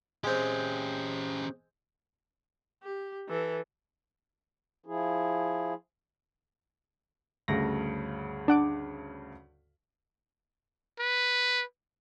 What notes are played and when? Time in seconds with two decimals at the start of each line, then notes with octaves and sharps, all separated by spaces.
0.24 G#3 C4 C#4 G4
2.83 G4
3.29 E3 A4
4.86 F3 E4 G#4
7.48 D2 G2 C#3 A#6
8.48 D4 F#5 D6
10.99 B4